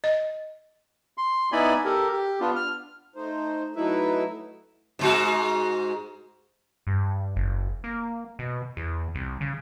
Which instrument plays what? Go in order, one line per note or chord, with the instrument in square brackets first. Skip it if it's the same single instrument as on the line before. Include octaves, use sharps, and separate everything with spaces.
[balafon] D#5
[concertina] C6
B3 D#4 E4 D5 G#5 B5
G4 A4 A#4
G4
B3 D4 F4
F6
[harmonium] A3 D#4 C5
F#3 A3 D#4 E4 B4 E5
[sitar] G#2 G#3 F#4
[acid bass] G2
F#1
A#3
B2
E2
C2
C#3